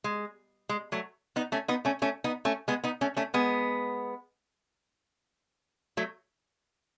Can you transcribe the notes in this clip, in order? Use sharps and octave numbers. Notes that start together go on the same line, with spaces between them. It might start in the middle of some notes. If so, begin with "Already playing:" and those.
G#3
G#3
F#3 A3
B3 D#4
A3 C#4
B3 D#4
A3 C#4
A3 C#4
B3 D#4
A3 C#4
G#3 B3
B3 D#4
A3 C#4
A3 C#4
G#3 B3
F#3 A3